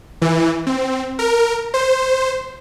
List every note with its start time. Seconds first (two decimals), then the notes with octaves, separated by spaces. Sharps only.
0.22 E3
0.67 C4
1.19 A#4
1.74 C5